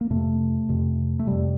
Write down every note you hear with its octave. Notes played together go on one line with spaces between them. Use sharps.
A#3
F2 C3 A3
F2 C3
A3
F2 C3 G3